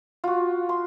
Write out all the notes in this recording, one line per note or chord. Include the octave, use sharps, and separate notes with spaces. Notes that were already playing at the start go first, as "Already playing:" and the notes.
F4 F#4
C6